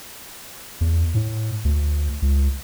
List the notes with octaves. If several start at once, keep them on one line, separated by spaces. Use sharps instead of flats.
E2
A2
D2
C#2